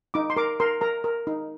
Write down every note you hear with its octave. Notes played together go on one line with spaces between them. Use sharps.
D#4 D6
C6
A#4 D6
A#4 C6
A#4 A#5
A#4
D#4